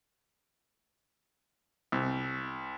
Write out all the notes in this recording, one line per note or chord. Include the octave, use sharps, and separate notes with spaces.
C2